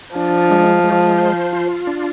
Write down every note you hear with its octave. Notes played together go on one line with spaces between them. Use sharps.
F3 D4
G#3
G#3
C5
F4
D4